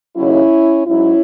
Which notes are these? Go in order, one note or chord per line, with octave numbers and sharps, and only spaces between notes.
D#2 C#3 F#3 C#4 E4
G#2 F#3 C#4 E4